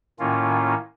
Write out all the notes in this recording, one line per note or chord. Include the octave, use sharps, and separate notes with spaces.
A2 D#3 A#3 C#4 F4